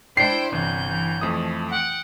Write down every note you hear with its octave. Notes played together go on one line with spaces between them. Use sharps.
D4 E4 C5 G5 C7
G1 C3 E3 G6
E3
F2 E3 F3 A3 D#6
F#5 G5